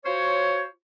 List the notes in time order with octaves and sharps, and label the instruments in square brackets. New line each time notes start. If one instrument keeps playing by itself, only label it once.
[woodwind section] F4 F#4 C5 C#5